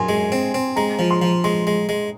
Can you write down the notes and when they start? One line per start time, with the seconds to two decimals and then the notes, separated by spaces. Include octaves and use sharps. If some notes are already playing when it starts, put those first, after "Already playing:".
Already playing: F#2 G#5 C6
0.09 G#3
0.32 C4
0.54 C4
0.76 G#3 A#5
0.99 F3
1.11 C6
1.22 F3
1.44 G#3 C6
1.67 G#3
1.89 G#3